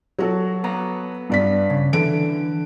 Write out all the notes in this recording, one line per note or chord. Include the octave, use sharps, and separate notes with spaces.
F#3 F#4 A4
B3 A#5
G2 D5 B6
C#3
D3 E3 D7